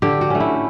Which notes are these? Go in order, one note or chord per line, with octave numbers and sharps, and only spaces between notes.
D3 G4
F#4
A3 C#4
E4